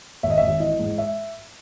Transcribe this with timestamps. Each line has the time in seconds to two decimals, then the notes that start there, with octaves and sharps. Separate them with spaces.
0.23 G#1 E5
0.30 D#5
0.38 G#1 E5
0.60 E3 D#5
0.79 G#2
0.98 E5